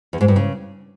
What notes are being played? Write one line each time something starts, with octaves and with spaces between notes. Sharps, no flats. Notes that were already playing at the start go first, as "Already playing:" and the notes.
E2
G#2
G2
C#3